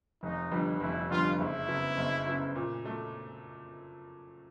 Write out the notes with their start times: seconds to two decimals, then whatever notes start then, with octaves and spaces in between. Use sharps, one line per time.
0.22 F1 D#4
0.52 F2 D3 G3 B3
0.81 F1 E4
1.10 F2 D3 G3 B3 F4
1.39 F#1 E4
1.68 F#2 C#3 F#3 B3
1.97 F#1
2.26 F#2 C#3 F#3 B3
2.55 A#2
2.85 F#3 A3